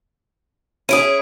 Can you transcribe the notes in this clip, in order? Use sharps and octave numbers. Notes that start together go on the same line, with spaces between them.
C#4 E4 G#4 D#6 D7 D#7